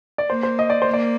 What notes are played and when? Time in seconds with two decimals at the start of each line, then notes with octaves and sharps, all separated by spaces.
0.18 D5
0.29 A#3 C5
0.43 C5
0.59 D#5
0.70 D5
0.82 C5
0.87 A#3
0.94 D5